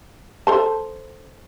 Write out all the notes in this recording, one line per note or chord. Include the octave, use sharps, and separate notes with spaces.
A4 C5 A5